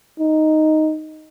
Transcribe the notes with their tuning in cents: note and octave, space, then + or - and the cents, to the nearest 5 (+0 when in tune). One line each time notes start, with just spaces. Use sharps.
D#4 +0